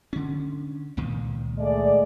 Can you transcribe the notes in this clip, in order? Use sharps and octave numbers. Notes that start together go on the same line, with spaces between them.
D3 C#4
C#2 A#2 D#3
G#3 A3 D5